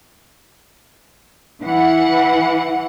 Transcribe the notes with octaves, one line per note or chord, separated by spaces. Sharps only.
E3 F#5